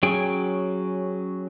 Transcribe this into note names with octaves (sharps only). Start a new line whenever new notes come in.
F#3 C#4 G#4 G5 G#5